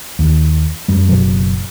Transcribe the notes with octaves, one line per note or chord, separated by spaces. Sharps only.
D#2
F#2 G3
F#1 B2 F#3